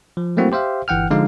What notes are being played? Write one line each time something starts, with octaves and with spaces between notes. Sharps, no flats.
F3
F#3 A3 A#3 C4 E4 F#4
G4 C5 E5 F5
G1 E3 F#5 G5 F6
D3 F3 G#3 D#4 F5